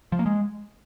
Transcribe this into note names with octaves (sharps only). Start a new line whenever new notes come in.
F3
A#3
G#3